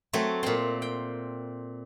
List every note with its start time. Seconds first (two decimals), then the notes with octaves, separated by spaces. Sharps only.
0.13 F#3 A3 C4
0.43 A#2 C4
0.82 G5